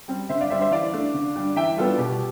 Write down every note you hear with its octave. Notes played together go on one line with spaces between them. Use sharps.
G3 C4
D3 C5 E5
D5 F5
G3 D4 C5 E5
C5 E5
E3 D5 F5
A3 D4
D3
G3 D4
E3 E5 G5
G3 B3 D4 F4 A4
B2 G4